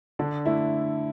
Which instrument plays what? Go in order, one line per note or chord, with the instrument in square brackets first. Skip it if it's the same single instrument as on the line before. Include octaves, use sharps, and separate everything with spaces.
[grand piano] D3 [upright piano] D4
[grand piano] A3 [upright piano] E4